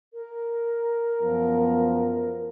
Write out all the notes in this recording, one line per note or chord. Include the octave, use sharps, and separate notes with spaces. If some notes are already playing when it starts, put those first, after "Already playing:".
A#4
F#2 F3 B3